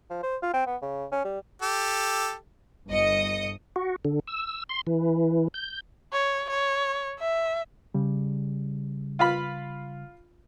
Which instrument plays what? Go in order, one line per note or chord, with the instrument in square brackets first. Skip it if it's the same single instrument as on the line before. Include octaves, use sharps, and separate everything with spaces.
[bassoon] F3
C5
F4
C4
B3
C#3
C#4
G3
[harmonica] G4 A4
[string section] G1 D#5 D#6 C#7
[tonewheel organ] F#4
D3
E6
C6
E3
G6
[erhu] C#5
C#5
E5
[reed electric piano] C#3 G3
[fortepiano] F4 F5 B5